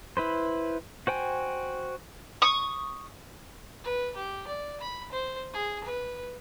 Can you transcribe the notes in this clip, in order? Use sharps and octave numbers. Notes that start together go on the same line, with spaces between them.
E4 B4 C5
F#4 C5 G5 G#5
C#6 D#6
B4
G4
D5
B5
C5
G#4
B4